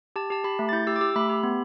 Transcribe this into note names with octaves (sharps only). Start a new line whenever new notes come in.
G4 A5
G4 A5
G4 B5
A3
A6
E4 G6
G4 E6
D6
G4 E6
A3 B5
G4
B3